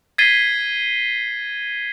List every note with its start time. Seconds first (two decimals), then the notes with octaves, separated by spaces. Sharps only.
0.18 G#6 A6 B6 C7 D#7 G7